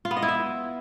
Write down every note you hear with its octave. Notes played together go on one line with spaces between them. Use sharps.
F4
B3
D#5
E4
E5